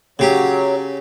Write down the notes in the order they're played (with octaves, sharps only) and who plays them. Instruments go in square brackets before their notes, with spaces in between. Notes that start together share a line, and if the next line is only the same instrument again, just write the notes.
[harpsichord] C#3 G4 [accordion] F#3